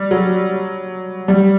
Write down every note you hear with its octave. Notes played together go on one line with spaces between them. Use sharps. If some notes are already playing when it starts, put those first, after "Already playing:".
Already playing: G3
F#3
G3